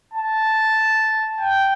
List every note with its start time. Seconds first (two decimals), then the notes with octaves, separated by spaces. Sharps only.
0.14 A5
1.41 G5